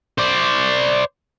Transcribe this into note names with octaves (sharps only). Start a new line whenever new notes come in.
C5 D5